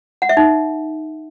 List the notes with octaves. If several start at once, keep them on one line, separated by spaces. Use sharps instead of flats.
F#5
E5
D#4